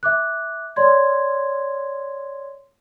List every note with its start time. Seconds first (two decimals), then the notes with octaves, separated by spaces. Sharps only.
0.03 E5 D6 F#6
0.76 C#5 D5 C6 G#6